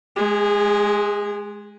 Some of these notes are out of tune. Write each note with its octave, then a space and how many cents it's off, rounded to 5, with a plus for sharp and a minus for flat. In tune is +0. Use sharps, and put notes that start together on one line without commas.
G#3 +15 G#4 -30